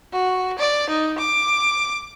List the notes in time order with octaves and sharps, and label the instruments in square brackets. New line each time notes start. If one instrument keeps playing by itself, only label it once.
[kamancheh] F#4
D5
D#4
D6